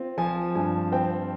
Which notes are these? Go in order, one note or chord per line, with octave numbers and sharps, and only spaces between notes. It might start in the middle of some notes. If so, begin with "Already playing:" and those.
Already playing: C4 F4
F3 G#5
G2 G#5
C4 G5